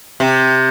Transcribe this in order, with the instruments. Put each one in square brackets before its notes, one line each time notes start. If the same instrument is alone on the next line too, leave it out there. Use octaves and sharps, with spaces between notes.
[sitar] C3